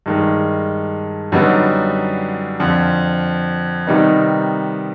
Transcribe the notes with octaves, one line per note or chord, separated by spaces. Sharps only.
G2 D#3 G#3
F#2 D3 G3 B3 D#4
F2 D3 F3
C3 D#3 G3 B3 D#4